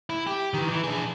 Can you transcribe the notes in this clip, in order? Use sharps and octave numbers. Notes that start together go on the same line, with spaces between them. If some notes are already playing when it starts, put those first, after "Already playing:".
E4
G4
D#3 E3
E3
D4 G#4